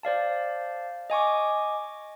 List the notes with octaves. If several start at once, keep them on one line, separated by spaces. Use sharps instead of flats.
C5 D5 F5 A5
D#5 G#5 C#6 D6